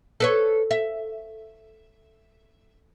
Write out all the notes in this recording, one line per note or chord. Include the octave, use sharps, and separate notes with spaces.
A4 B4 C#5
E5